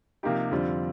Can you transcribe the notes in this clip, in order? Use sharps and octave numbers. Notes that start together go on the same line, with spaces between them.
C3 F3 A#3 D#4 G4
F2 D3 G3 C4 F4